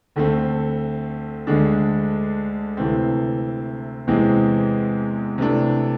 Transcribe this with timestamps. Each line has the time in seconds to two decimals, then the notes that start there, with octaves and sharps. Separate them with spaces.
0.16 D2 D3 A3 C4
1.47 D2 D3 G#3 D4
2.77 D2 C3 E3 A3 C4
4.07 E2 C3 E3 G#3 C4
5.38 C3 E3 A3 D4